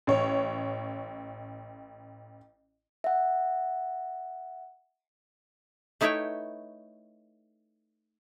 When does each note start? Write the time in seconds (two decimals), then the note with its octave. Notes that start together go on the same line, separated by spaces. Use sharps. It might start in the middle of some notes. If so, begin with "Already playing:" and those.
0.07 A1 C#5
3.04 E5 F#5
6.01 A3 D#4 E4 B4 C#5 G5